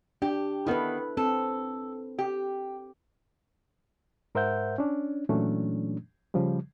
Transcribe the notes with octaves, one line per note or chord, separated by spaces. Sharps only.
D4 G4
D#3 B3 E4 A4 B4
C4 A4
G4
G#2 A#4 C5 E5 F#5 G6
C#4 D4
A#2 E3 F#3 A3 C#4 D4
C#3 F3 G3